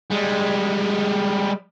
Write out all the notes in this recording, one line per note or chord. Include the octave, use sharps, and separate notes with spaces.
G3 G#3